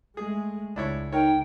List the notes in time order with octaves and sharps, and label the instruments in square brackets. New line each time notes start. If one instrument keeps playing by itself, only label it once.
[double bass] G#3 A3 [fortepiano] G#4
[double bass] C#2 [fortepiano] D4 E4 C#5
[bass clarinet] D#4 [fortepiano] A#4 C#5 [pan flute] G5